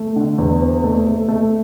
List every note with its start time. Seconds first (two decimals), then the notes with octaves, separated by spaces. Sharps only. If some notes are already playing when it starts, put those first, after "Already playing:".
Already playing: A3
0.16 D3
0.38 E2
0.61 C4
0.84 A3
1.06 A3
1.28 A3